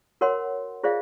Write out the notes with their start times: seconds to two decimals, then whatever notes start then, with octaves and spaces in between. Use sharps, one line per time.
0.21 F#4 A#4 C#5 F#5 C6
0.83 F4 G#4 C5 D5 E5 F5